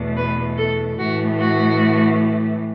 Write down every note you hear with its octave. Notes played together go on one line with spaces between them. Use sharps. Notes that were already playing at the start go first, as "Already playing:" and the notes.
Already playing: E2 B2 A3
B4
A4
A2 E3 A3 F#4
F#4